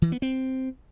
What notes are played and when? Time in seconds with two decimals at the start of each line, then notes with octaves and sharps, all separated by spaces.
0.02 E3
0.12 B3
0.22 C4